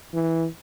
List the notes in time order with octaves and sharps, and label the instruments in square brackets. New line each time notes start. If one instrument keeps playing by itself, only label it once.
[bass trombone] E3